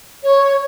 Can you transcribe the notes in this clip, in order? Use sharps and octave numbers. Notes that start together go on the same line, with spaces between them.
C#5